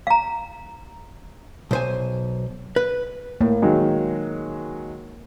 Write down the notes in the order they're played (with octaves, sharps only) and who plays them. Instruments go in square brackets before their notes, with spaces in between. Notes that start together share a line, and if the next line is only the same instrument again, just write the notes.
[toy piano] F5 A#5
[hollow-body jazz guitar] B1 C5 G#5
B4
[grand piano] A2 [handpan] A#3
[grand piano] D#3 F#3 G#3